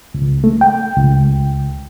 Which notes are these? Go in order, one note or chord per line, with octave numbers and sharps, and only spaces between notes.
C#2
A3
G5
C#2